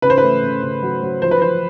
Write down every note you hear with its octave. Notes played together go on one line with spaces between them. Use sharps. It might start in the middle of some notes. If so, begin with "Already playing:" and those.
C#3 B4
C5
A3 B4
C#3
C#3
F#3
F#3
F3 C5
B4
F3 C5